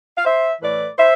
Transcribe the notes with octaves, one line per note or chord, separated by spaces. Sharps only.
F5
C5 E5
A2 E3 A3 B4 D5
C5 E5